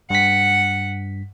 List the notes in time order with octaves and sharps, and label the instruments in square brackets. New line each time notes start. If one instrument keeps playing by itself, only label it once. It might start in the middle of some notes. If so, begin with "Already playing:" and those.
[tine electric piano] G2 B6 [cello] F#5